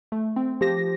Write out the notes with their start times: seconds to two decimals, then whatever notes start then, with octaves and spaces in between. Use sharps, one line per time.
0.12 A3
0.36 C4
0.61 F3 G4 C5 A#6